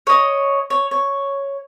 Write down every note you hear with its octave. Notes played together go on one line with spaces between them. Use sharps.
C#5 D#5
C#5
C#5